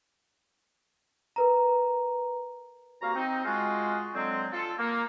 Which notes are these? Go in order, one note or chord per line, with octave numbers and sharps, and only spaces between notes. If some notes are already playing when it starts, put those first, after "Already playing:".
A#4 B4 A#5
C2 A#3 F#4 F5 A#5
C4 D#4
G#3 F4 F#4
D3 F#3 G#3 C4
F4 A4
A#3